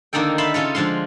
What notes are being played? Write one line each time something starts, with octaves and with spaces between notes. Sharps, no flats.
D3 D#3 A#3 D#4 A4 G5
E5 F5 A5 B5 C6
C#3 C#4 F4 A4
D3 F3 G#3 F5 C6